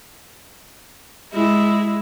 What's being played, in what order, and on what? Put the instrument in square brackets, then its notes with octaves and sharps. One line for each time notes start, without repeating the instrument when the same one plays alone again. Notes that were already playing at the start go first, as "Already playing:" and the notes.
[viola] G#3 E4